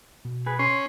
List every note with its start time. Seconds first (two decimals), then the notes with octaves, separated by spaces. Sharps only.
0.25 B2
0.46 G#4 B4
0.59 C#4 C6